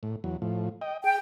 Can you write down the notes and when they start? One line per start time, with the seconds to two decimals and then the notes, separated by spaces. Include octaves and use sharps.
0.03 A2
0.24 E2 F#3
0.42 A2 F3
0.81 D#5 G5
1.04 G#4 G5